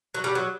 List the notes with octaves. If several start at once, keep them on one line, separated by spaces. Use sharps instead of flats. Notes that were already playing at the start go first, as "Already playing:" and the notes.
F#3
G3
F#3